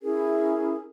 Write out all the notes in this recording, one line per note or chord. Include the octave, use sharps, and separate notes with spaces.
C#4 E4 G#4 A#4